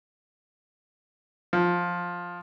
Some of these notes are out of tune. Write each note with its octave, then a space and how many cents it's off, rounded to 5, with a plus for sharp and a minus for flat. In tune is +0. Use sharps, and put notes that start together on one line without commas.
F3 +10